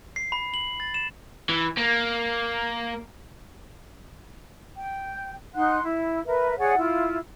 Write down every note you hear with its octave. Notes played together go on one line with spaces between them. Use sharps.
C7
B5
F#7
A6
E7
E3
A#3
G5
D#4 F#5 C6 F#6
E4
A#4 B4 E5
G#4 C#5 D5 F#5
E4 F4